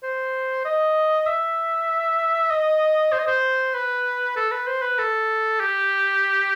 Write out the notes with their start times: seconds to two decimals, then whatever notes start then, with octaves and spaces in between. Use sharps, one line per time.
0.03 C5
0.65 D#5
1.27 E5
2.51 D#5
3.12 C5
3.19 D#5
3.27 C5
3.75 B4
4.36 A4
4.51 B4
4.67 C5
4.82 B4
4.98 A4
5.60 G4